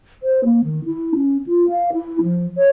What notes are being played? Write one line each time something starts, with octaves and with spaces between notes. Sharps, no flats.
C5
A#3
D#3
E4
C#4
F4
F5
E4
F3
C#5